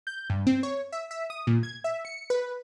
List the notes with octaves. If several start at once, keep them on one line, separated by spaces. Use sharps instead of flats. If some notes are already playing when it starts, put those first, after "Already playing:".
G6
G2
C4
C#5
E5
E5
D#6
A#2
G#6
E5
C#7
B4